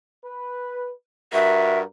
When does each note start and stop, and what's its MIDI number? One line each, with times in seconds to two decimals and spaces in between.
0.24 0.91 71
1.33 1.83 43
1.33 1.83 66
1.33 1.83 70
1.33 1.79 76